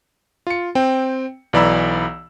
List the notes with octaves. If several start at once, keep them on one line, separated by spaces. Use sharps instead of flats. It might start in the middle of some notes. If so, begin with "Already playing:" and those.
F4 C#7
C4 G5
B1 E3 D5 A#5 B5 E6